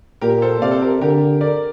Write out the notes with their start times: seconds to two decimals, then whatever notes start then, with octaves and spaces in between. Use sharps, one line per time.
0.21 A#2 G4 A#4
0.42 A4 C5
0.61 C3 D5 F5
0.71 A4 C5
0.81 G4 A#4
1.01 D3 G4 A#4
1.41 A#4 D5